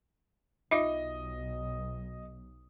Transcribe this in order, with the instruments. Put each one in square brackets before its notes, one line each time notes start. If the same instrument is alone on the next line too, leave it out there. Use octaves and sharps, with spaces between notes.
[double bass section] B1 [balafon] D#4 F4 E5 [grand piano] D#5